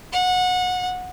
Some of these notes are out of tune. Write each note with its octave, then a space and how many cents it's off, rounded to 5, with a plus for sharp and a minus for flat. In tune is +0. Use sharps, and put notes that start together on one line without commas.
F#5 -25